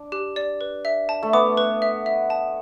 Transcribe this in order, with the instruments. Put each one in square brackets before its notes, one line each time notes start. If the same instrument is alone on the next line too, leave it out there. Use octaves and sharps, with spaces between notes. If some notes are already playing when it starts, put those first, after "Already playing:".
Already playing: [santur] D4
[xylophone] G4
D5
B4
E5
A5
[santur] A3
[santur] B3 [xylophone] D6
[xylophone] B4
E5
E5
A5